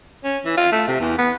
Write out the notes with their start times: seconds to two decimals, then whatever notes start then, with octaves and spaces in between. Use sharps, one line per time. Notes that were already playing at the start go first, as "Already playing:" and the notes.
0.24 C#4
0.45 E3
0.57 F4
0.72 A3
0.88 C3
1.00 E2
1.18 B3